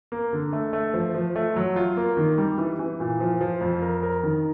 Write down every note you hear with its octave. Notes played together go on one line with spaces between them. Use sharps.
A#3
D3
A3
A3
F3
F3
A3
F#3
F4
A#3
D#3
G3
E3
E3
A#2
F3
F3
F2
A#4
A#4
D#3